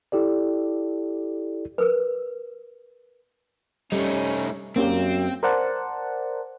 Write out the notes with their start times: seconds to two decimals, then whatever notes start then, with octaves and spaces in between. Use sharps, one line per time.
0.12 E4 G4 A4 D5
1.78 A#4 B4
3.92 G3 A3 C#4 D#4
4.76 F#2 A#3 C4 C#4 G4
5.43 A#4 C5 D5 F#5 A5